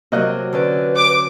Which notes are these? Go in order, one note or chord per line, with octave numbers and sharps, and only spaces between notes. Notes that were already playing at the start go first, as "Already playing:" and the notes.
C3 F#3 A#3 D#5 F#6
D3 C#4 B4 D5
D6